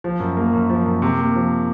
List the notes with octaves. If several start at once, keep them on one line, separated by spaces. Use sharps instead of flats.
F3
F#2
A#3
F#2
F3
F#2
C3
A#3
F3